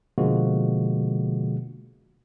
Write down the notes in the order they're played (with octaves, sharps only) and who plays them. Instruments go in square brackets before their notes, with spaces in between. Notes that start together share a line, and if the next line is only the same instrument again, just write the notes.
[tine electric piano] B2 D3 F3 G#3 A#3 F#4